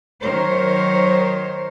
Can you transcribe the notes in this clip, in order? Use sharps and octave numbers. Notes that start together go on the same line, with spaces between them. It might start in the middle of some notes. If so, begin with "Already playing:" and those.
D#3 F#3 A#4 C5 C#5